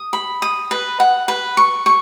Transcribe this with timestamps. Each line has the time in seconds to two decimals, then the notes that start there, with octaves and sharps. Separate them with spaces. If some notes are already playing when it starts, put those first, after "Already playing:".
Already playing: D#6
0.13 B5
0.42 D#6
0.71 B4
1.00 F#5
1.28 B4
1.57 C#6
1.86 C#6